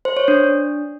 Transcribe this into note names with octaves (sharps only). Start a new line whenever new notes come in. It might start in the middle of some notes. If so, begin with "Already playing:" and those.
C5
C#5
D4